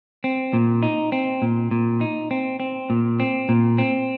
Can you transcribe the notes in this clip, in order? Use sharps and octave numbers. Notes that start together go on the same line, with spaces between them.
C4
A#2
D#4
C4
A#2
A#2
D#4
C4
C4
A#2
C4
A#2
C4